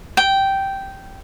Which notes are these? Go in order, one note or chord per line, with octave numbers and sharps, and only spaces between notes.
G5